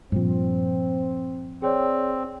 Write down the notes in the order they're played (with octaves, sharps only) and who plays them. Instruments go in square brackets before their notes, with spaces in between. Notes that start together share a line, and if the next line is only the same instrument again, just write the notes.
[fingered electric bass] G2 A#2 F3 [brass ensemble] C4
[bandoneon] C4 [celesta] G#4 C#5 D5